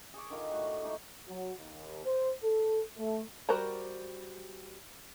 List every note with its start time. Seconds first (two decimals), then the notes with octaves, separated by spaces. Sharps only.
0.14 G#4 C#6 D6
0.30 D3 D#3 F4 D#5
0.51 A2 F#4
0.83 G#3 A3 D4 D#4
1.28 F#3
1.59 D#2
2.05 C5
2.43 A4
2.97 A3
3.49 G3 F#4 A#4 C5 A#5